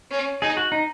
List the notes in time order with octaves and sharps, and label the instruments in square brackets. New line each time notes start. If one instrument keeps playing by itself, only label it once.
[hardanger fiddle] C#4
[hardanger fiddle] D#4 [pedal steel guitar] G#4
[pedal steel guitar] F#4
D#4